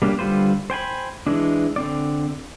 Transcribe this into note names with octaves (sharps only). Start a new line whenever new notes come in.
G3 A#3 C#4 D4 G4
D3 G3 F4 B4 C5
C5 G5 G#5 B5
E3 G#3 D4
D3 C4 D5